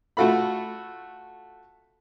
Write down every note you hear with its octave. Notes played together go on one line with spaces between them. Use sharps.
A3 F4 F#4 A4 B5